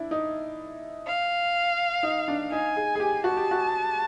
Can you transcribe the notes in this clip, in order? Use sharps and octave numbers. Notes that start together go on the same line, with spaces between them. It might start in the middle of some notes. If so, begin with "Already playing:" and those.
Already playing: D4 E4
D#4
F5
D#4
D4
D#4 G#5
G#4
G#4
G4
F#4 A5
G4
F#4